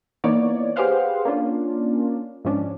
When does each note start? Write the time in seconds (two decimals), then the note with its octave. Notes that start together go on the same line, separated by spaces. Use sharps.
0.24 E3 A#3 B3 D#4 C#5 D5
0.76 G4 G#4 B4 C5 F5 F#5
1.25 A#3 C#4 D4 F4
2.45 G#2 F3 C#4 D4